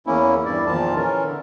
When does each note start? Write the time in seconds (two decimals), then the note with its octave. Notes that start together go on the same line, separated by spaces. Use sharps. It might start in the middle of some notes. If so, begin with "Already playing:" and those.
0.07 E2 A#3 C#4 E4
0.45 E2 G2 E4 D5
0.67 E2 A#2 D#3 F3 F4 A5
0.97 E3 C#4 A#4
1.24 D3